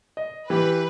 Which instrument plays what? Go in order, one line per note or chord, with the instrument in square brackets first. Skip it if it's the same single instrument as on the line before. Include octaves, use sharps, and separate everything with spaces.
[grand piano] D#5
[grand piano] E3 G4 [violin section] B4